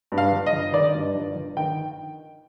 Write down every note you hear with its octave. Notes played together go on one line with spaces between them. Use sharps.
G2
F5
G1
D#5
G1
D#3 D5
G2
G1
G1
D#3 G5